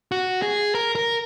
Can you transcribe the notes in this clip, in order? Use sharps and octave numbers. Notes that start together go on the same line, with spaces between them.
F#4
G#4
A#4
A#4